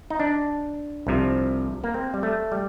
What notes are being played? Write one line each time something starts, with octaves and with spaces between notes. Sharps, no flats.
D#4
D4
C2 C3 F3
A#3
C4
G3
A3
G3